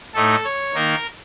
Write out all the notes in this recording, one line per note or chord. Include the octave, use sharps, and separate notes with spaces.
A2 A3 D#4 A4
C#5
D#3 A#3 D#4 A#4